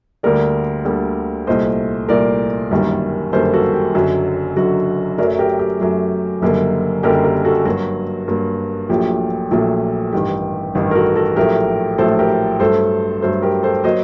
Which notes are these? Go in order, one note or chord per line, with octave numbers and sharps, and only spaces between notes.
D2 D3 G3 A#3 A#4 D5
D2 D3 G3 A#3
C2 A#2 A3 C5 D#5
C2 A#2 A3 A#4 D5
G1 F#2 D#3 G3 A#3
G1 F#2 D#3 G3 A#3 A4 C5
F#4 A4
G4
F#1 F#2 D3 F#3
F#1 F#2 D3 F#3 F#4
F#2 F#3 A3 A#4 D5
G4 A#4
G4
F#2 F#3 A3
F#1 F#2 D3 G3 A#3
F#1 F#2 D3 G3 A#3 G4 A#4
G4 A#4
F#4 A4
G2 F#3 A#3 F#4
G2 F#3 A#3
A#1 A#2 F#3 A3 G4
A#1 A#2 F#3 A3
A1 G2 D#3 G4
A1 G2 D#3
A#4
F#4 A4
F#4 A4
A#1 A2 F#3 A3 G4 A#4
A#1 A2 F#3 A3 A4 C5
G4 A#4
G2 F#3 A3 A4 C5
G2 F#3 A3 A4 C5
G4 A#4
A4 C5
F#3 A#3 C5 D#5